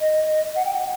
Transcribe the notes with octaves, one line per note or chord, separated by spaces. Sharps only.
D#5
F#5
G5
F#5